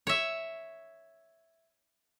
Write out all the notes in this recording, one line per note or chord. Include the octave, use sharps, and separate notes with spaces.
C#5 E5